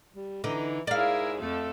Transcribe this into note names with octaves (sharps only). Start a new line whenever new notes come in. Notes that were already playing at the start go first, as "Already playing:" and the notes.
G3
D3 E3 D#4
G#2 E4 G#4 A#4 D5 F5
F2 F3 A3 A4